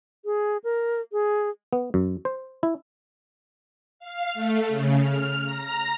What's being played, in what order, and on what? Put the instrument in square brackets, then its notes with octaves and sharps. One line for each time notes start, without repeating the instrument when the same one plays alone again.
[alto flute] G#4
A#4
G#4
[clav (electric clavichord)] B3
F#2
C5
E4
[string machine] F5
A3
C#3
F6
A#5